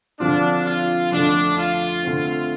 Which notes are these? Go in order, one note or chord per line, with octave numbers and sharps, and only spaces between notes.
D3 F3 C4 D4 F4
F4
F2 D3 A3 D4
F4
D3 A3 C4